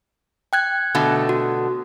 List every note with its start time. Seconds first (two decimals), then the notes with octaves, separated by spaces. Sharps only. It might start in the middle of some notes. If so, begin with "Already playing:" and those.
0.53 G5 F#6 G#6
0.95 B2 D3 A3
1.29 F#4